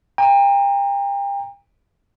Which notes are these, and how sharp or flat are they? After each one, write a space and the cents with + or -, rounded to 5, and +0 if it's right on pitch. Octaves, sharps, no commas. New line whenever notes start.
G5 +35 A#5 +0